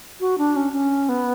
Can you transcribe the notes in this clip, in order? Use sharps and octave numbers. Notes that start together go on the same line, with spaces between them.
F#4
D4
C#4
C#4
B3